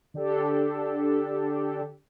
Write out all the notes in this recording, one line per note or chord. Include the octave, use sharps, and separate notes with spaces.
D3 D4 G4 A4